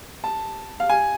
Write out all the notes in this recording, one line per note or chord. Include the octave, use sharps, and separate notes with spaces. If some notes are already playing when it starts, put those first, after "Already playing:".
A5
F5
G#5